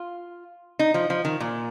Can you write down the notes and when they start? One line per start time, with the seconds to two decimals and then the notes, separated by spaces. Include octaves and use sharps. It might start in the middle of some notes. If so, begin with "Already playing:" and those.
Already playing: F4
0.79 D#4
0.94 F3
1.10 F3
1.25 D#3
1.40 A#2